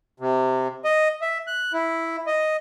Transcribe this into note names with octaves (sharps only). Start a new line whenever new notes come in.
C3
D#5
E5
F#6
E4
D#5